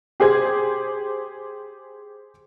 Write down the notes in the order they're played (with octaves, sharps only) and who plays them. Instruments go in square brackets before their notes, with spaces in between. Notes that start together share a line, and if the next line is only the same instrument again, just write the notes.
[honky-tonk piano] G4 G#4 C5 G#6